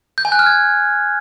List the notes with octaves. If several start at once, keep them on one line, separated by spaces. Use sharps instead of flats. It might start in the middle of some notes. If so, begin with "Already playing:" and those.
G6
G#5
F#6
F6
G#6